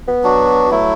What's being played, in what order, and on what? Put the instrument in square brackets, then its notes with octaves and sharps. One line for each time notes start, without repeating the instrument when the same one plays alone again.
[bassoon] B3
[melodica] F#3 D4 F#4
F#3 A3 E4